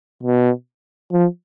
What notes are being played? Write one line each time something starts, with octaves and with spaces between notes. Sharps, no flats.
B2
F3